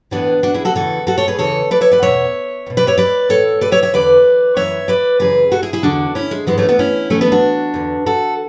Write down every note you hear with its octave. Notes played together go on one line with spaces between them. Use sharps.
A2 E3 B3 D4
D4 F#4
E4 G#4
F#4 A4
E2 C#3 E3 F#4 A4
F#4 A4
A4 C#5
G#4 B4
E2 C#3 E3 A4 C#5
B4 D5
C#5 E5
B4 D5
E2 B2 C#5 E5
E2
B2
B4 D5
C#5 E5
B4 D5
A2 E3 A4 C#5
B4 D5
C#5 E5
C#5 E5
E2 D3 B4 D5
F#2 E3 C#5 E5
B4 D5
F#2 C#3 E3 G#4 B4
F#4 A4
E4 G#4
E4 G#4
E2 D3 D4 F#4
C#4 E4
G#3
G#2 E3 G#3 B3
A3 C#4
B3 D4
C#4 E4
A2 E3 A3 C#4
B3 D4
D4 F#4
E2 D3
F#4 A4